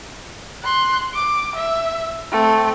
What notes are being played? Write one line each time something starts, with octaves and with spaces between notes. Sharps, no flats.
C6 F#6
D6
E5
A3 C4